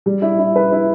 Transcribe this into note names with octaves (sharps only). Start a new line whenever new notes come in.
G3
E4
E4
B4
E4